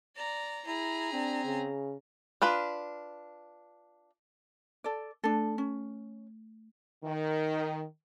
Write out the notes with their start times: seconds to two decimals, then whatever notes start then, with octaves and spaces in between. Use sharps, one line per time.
0.16 D5 A#5
0.66 E4 G#4 A#5
1.12 C4 D4
1.45 C#3
2.42 D4 F4 B4
4.84 A4 D5
5.24 A3 D4 A4
5.58 C#4
7.04 D#3